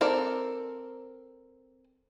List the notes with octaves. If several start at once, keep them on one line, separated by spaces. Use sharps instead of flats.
C4 A4 A#4 D5